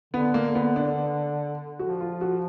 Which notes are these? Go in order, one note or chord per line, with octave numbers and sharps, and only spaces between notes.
D3 B3
A#3
B3
D4
F3 F#4
F4
F#4